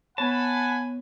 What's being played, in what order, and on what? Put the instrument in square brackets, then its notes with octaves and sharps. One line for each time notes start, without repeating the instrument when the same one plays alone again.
[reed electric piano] B3 C#5 [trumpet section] F#5 G#5 B5 [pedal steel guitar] A5